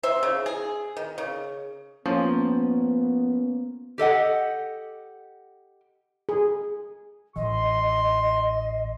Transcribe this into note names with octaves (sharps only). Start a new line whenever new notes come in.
C5 E5
C#3
G#4
D#3
C#3
F3 A#3 B3 C#4
G4 A4 D#5 F#5
G#4
A1 E3 D#5 C6